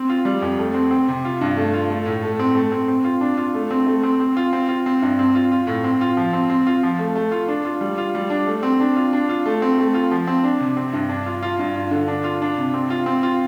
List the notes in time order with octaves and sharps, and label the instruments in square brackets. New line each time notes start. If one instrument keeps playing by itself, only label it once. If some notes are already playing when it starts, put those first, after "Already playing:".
Already playing: [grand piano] C4
F4
G3
F2
A3
C4
C4
C3
F4
G2
A3
F4
A3
A2
A3
C4
A3
C4
C4
F4
D4
F4
A3
C4
A3
C4
C4
F4
C4
F4
C4
G2
C4
F4
F4
A2
C4
F4
F3
C4
C4
F4
F3
A3
A3
F4
D4
F4
G3
F4
G3
D4
A3
C4
D4
F4
D4
F4
A3
C4
A3
F4
F3
C4
D4
C3
C4
G2
D4
F4
F4
G2
F4
D3
D4
F4
D4
C3
C4
F4
C4
F4